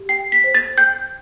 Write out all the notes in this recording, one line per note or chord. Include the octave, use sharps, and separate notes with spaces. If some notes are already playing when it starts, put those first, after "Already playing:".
Already playing: G4
G5 C7
B6
C5
A6
G5 G6